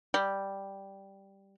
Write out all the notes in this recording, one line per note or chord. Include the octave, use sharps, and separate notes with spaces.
G3